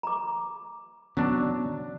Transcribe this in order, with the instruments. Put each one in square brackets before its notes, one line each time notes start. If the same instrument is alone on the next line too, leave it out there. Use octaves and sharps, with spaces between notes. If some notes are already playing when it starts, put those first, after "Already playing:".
[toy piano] A#5 D6
[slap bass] E3 B3 C#4 [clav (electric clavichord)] F#3 D4